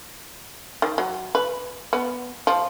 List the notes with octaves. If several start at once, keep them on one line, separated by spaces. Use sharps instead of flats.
D#3
F#3
B4
B3
F3